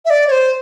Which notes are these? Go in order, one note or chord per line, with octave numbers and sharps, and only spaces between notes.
E5
D5
C#5
C5